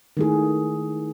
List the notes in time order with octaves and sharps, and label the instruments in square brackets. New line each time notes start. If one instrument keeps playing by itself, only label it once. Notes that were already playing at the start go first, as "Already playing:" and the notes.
[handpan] D#3 A3 E4 G#4